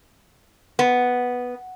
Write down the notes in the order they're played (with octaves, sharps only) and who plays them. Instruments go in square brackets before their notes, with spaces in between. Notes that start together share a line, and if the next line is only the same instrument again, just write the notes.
[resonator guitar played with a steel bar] B3